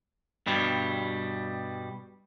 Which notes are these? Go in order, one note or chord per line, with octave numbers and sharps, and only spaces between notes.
G2 B2 G3